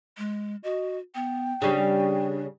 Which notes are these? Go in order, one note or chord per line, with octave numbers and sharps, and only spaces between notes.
G#3
F#4 D#5
B3 G5
C#3 G3 D4